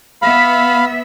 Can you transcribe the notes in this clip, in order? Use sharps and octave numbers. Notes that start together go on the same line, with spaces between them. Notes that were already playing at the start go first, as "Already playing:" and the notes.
B3 E5 F5 B5